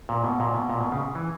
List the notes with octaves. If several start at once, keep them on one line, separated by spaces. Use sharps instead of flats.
A#2
B2
A#2
B2
A#2
B2
C#3
E3